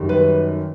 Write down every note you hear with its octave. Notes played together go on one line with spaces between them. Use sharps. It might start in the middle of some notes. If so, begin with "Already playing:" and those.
Already playing: F#2 D#3 G3
B4